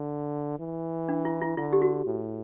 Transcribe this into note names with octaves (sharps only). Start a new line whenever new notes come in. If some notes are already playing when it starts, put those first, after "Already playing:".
Already playing: D3
E3
D4
E4
E4
D3 E4
G4
F#4
A2